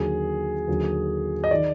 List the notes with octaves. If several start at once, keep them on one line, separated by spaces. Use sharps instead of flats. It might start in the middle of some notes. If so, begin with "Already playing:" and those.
Already playing: D#2 D3 F#3 G#4
D#2 D3 F#3
D#5
D#3 D5